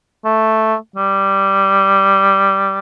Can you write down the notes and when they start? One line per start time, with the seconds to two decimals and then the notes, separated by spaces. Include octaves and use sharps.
0.25 A3
0.96 G3